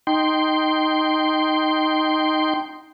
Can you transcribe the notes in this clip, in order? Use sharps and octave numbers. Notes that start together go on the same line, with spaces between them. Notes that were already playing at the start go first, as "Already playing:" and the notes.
D#4 G5 C6